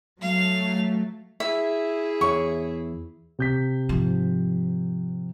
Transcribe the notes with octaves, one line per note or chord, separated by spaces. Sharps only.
F#3 A3 F5
E4 G#4 E5
E2 C#5 C#6
C3 G6 B6
G#2 F3